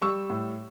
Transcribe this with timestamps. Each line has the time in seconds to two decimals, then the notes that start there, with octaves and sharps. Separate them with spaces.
0.01 G3 C#6 E6
0.30 A2